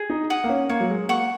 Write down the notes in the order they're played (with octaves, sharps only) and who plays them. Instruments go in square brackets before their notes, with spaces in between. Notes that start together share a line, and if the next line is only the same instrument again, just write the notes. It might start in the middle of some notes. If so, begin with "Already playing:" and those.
Already playing: [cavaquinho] G#4
[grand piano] D#4
[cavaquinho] F#5 D#6
[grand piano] A#3
C#4
[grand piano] A#3 [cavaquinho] C#5
[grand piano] F#3
G#3
[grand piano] A#3 [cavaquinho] F#5 C#6